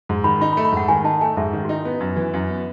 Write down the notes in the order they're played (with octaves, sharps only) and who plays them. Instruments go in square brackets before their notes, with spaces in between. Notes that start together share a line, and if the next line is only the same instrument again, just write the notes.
[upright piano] G#2
[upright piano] D#3 [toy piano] B5
[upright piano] D#4 [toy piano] B5
[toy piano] B5
[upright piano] A3
[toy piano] B5
[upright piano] G#2 [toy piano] F#5
[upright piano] D#3 [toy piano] G#5
[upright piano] D#4 [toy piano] A5
[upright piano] A3 [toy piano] G#5
[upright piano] G#2 [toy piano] E5
[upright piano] D#3
[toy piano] F#4
[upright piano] D#4 [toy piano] E4
[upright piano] B3
F#2
E3
F#2
B3